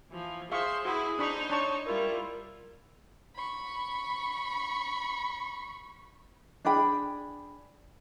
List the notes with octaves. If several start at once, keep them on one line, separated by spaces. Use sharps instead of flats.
E3 F3
G#4 C5 E5 F5 C6 C#6
E4 F#4 G#4 B4
D4 D#4 C5 B5 C#6
D4 C#5 A5 C#6
G3 E4 F4 A#4
B5 C#6
D4 G#4 G5 B5